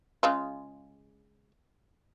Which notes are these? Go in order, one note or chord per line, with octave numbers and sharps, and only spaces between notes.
C#3 G#3 F4